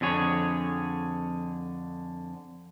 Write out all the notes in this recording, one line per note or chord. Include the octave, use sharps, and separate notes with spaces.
F2 D3 G#4 C#5